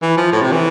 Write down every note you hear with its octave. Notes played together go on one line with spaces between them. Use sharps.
E3
F3
A2
C3
E3